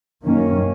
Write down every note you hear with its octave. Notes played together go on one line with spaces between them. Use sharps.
F#2 D#3 A#3 C#4